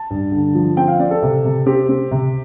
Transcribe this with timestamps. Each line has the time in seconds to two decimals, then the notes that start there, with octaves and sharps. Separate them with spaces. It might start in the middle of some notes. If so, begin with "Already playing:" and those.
Already playing: A5
0.10 G2
0.32 D3
0.55 F3
0.77 C4 G5
0.88 F5
0.99 C4 D5
1.11 A4
1.22 C3
1.45 C3
1.66 C4 G4
1.89 C4
2.11 C3